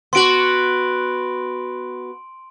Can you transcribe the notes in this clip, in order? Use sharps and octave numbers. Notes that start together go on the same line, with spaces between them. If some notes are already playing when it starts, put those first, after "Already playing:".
B3 F#4 C6 D7 F#7